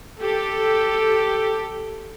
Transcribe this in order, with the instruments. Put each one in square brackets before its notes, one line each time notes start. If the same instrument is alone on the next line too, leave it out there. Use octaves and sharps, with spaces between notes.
[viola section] G4 A4